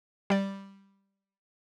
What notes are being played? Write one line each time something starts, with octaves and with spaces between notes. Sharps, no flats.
G3 D5